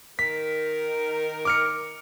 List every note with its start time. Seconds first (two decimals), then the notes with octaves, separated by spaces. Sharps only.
0.19 D#3 A#4 B6
1.45 D6 F6 C#7